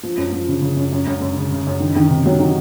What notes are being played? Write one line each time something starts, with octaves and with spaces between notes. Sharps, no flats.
F3
F#2
F3
C#3
C#3
F#2
F#2
F#2
F#2
C#3
C#3
F#2
D#3
D#3
C3
F#3
D#3